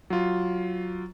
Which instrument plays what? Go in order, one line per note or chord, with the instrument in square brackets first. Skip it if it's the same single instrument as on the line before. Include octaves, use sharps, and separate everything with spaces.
[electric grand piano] F#3 F4